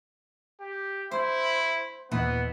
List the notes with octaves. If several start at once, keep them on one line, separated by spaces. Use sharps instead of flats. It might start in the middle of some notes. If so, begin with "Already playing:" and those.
G4
E4 C5
D#2 A#2 E3 B3